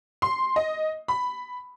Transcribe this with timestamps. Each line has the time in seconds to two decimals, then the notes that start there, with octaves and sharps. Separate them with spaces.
0.22 C6
0.56 D#5
1.08 B5